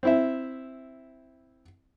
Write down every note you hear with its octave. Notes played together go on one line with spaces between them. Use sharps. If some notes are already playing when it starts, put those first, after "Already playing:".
C4 E4 E5